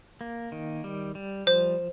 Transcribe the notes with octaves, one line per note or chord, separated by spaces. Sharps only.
A#3
D#3
G3
G3
F3 C5